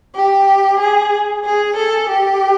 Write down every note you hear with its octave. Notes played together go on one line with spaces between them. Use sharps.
G4
G#4
G#4
A4
G4